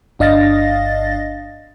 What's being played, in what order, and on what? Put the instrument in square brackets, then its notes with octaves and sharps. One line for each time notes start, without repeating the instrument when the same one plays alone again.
[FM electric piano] G1 D4 D#5 F5 A6 A#6